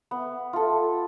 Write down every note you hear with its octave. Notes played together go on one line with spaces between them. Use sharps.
B3
F4 A4